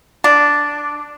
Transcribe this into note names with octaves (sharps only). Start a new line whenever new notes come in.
D4